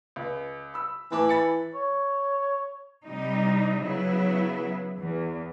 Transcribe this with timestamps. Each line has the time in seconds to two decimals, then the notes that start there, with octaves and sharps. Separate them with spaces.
0.16 C#2
0.74 B5 E6
1.12 A2 E3 A5 D6
1.29 B5 A6 C#7
1.75 C#5
3.06 C3 G3 D#4
3.82 C#3 F#3 B3 E4
5.00 E2